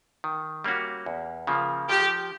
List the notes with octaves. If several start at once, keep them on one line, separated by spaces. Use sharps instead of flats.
D#3
G3 A#3 C#4 F#4
E2
C#3 F3 A#3
F3 G4